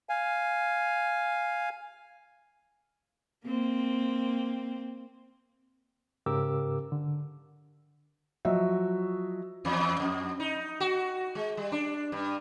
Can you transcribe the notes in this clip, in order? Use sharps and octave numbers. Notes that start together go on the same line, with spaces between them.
F5 G#5
A#3 C4
G#2 C#3 G4 A#4 D6 E6
D3
F3 F#3 F#4 D#5 E5
E2
F2
D#4
F#4
G#3
G3
D4
G2